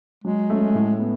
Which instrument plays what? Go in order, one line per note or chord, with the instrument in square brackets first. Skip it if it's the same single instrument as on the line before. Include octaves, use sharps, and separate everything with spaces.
[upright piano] F#3 [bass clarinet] G#3
[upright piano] A3 C#4
A2
B3